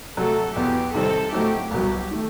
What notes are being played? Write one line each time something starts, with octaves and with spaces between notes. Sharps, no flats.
C3 F#3 A3 A4
E2 B2 F#3 B3 G4
C3 D#3 G3 C4 D#4 A4
A2 F#3 A3 C4 D#4 G4
C2 B2 F#3 G4
D#3 A3